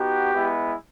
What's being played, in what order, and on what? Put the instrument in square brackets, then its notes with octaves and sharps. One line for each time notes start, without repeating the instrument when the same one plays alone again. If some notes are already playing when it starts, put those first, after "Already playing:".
Already playing: [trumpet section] B3 D#4 F#4 G4
G#3 B3 E4